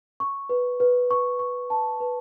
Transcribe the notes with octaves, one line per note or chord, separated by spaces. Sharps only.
C#6
B4
B4
C#6
C#6
A5
B4